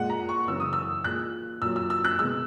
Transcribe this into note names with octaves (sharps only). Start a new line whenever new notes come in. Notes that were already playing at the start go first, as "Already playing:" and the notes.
Already playing: A#2 G#3 F#5
A#5
C#6
F#2 C#3 E3 E6
D#6
E6
A#2 G#3 F#6
A#2 F#3 E6
E6
E6
F#6
B2 G#3 E6